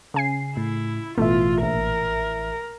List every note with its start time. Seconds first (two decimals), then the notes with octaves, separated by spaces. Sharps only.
0.14 C#3 G#5 C7
0.57 A2 E4
1.18 A1 B2 E3 A3 F4 E5
1.63 A#1 A#4